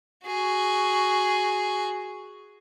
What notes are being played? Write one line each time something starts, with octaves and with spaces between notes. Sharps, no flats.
F#4 G#4